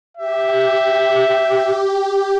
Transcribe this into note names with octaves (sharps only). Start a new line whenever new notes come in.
G4 E5